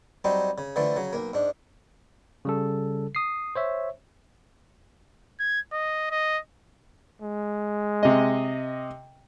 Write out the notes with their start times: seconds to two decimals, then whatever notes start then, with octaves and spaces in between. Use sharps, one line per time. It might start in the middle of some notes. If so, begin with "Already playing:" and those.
0.24 F#3 G3 C4 D#4
0.58 C#3
0.76 D3 E3 F3 A3
0.96 C#3 F#3
1.13 B1 A#3
1.33 G#2 D4
2.45 C#3 G3 A4
3.15 D#6 C7
3.56 C5 C#5 E5
5.40 G#6
5.73 D#5
6.11 D#5
7.22 G#3
8.03 C3 D#5